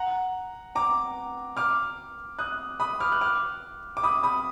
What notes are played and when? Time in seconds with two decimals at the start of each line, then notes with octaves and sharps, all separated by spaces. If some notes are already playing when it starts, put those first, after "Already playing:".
Already playing: F#5 A#5
0.75 A#5 D6
1.57 D6 F6
2.39 D#6 F#6
2.80 B5 D#6
3.00 D6 F6
3.12 F#6
3.21 D6 F6
3.97 D6
4.03 B5 D#6
4.23 B5 D#6